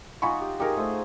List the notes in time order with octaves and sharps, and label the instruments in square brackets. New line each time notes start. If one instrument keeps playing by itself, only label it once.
[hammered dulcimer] D#4 F4 F#4 [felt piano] G#5 B5 C#6
[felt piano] G4
[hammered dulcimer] D#4 G#4 [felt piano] G4 A#4
[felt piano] A3 [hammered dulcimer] C5